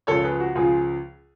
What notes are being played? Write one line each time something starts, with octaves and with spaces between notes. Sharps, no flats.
C#2 C#3 F3 A4 C#5
G#4 B4
F#4
C#2 C#3 F3 F4 G#4